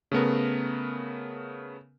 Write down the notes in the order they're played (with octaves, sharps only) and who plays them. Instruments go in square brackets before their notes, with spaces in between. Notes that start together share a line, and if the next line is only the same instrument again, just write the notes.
[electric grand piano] C#3 A3 B3 A#4